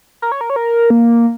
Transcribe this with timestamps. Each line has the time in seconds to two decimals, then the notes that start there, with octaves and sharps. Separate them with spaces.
0.22 A#4
0.32 C#5
0.41 A#4
0.50 C#5
0.56 A#4
0.90 A#3